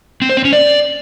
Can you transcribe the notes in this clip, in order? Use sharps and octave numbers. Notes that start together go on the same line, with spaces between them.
C4
C5
C4
C#4
D5